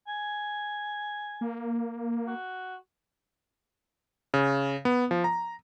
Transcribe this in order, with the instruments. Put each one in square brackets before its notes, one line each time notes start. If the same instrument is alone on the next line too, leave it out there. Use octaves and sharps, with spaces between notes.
[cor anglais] G#5
[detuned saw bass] A#3
[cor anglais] F#4
[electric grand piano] C#3
B3
F3
A#5